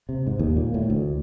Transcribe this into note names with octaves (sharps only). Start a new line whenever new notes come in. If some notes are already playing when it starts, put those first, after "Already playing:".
C3
G#2
D#2
A#2
A2
D2